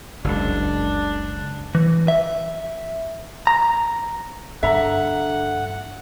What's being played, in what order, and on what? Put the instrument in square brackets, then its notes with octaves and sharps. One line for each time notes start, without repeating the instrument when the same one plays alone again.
[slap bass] F#1 C#2 [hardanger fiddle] D4
[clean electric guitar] E3
E5
A#5
[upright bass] G2 [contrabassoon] D3 [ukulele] E5 A#5 [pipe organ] F#5